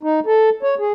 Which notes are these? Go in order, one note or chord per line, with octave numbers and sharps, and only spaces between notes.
D#4
A4
C#5
G#4